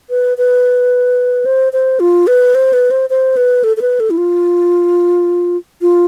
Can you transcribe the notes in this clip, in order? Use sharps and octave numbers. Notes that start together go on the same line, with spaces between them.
B4
B4
C5
C5
F4
B4
C5
B4
C5
C5
B4
A4
A4
B4
A4
E4
F4
F4